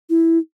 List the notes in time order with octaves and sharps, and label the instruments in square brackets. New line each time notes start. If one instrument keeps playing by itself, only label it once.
[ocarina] E4